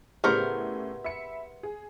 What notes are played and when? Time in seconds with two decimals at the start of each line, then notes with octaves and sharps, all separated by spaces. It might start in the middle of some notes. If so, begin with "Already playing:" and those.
0.24 A2 C#3 B3 G4 G#4 A#4 C5 D5
1.04 E5 B5 C#7
1.63 G#4